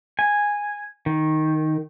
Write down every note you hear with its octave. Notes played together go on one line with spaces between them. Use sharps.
G#5
D#3